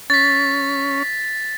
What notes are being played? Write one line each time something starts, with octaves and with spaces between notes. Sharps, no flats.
C#4 A6 B6